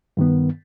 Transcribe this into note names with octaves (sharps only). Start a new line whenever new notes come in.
G2 D#3 B3